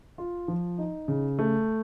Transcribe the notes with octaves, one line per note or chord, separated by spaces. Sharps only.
F4
F3
D#4
C#3
A3